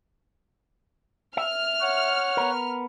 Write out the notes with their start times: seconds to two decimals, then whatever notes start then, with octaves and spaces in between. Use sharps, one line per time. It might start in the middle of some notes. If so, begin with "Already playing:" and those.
1.37 E5 F6
1.81 C#5 F#5
2.37 B3 A#4